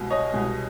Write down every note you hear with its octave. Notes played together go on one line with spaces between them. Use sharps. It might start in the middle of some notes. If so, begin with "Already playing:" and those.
Already playing: C2 B2 G#3
C#5 D#5
C2 B2 G#3